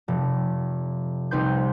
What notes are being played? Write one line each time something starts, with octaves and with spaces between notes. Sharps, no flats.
F1
C2 C4 D#4 B4 C6 G6